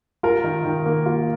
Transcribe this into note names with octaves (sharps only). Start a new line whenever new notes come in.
F4 A#4
D#3
D#3
A#3
F4